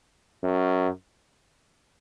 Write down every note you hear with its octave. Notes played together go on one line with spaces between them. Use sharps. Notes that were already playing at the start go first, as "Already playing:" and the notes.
F#2